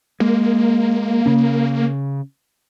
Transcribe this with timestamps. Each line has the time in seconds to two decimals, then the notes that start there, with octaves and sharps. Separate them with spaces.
0.20 G#3 A#3
1.26 C#3 C#4